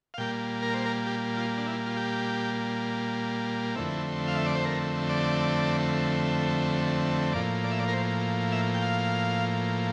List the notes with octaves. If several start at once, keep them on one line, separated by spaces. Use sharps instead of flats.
F5
A#2 G3 A#3 G5
A#4
C5
A#4
G4
F4
D4
E4
F4
G4
F2 D3 A3 C4 E4
F5
E5
D5
C5
A#4
D5
A2 F3 A#3 D5
D5
E5
D5
A#4
C5
E5
G5
F5